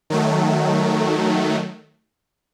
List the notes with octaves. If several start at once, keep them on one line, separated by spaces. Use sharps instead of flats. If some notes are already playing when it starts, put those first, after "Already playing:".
D#3 F#3 A3